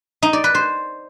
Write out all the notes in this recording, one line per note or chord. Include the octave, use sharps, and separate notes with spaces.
D#4
D5
B4
C5